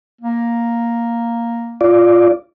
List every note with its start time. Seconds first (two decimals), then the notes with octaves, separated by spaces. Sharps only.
0.21 A#3
1.81 F4 D5